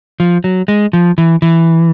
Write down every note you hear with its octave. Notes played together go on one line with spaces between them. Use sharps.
F3
F#3
G#3
F3
E3
E3